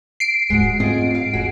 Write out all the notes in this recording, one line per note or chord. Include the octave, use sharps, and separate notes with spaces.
C7 D7
D1 G#2 G#3 F#4
G#2 A3 C4 F4 G#4 D#5
F5
E1 F#4 G#4